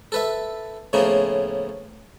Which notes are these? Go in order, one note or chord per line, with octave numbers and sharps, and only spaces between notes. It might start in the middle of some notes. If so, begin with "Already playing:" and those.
A4 B4 E5
A2 C#3 F3 A#3 B3